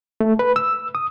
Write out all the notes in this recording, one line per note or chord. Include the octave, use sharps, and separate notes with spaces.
A3
B4
E6
D#6